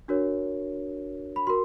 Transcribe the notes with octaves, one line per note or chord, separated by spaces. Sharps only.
D4 F#4 A#4 C#5
B5
F#4 A#4 C6